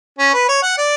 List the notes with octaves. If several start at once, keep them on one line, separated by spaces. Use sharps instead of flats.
C#4
B4
C#5
F#5
D5